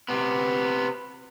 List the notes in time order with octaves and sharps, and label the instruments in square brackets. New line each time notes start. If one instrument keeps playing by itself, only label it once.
[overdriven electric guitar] C3 B3